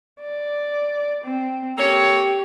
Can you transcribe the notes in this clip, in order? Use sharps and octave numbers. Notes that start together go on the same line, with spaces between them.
D5
C4
A#3 G4 A4 C#5